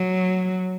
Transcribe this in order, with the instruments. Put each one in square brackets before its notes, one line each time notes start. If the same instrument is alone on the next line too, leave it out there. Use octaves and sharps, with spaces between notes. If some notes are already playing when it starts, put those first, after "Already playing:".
Already playing: [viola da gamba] F#3